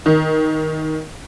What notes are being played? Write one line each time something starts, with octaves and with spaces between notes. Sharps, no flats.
D#3